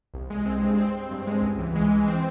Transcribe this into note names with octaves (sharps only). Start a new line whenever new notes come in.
C2
G#3
C4
G2
C4
C4
G2
G#3
C#2
E3
G#3
E3
C4